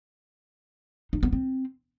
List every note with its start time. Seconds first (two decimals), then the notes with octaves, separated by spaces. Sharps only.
1.13 D#4
1.23 B3
1.33 C4